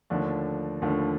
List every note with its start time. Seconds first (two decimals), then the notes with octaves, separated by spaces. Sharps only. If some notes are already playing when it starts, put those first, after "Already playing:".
0.10 D#2 D3 F3 A3 D4
0.82 D#2 D3 F3 A3 D4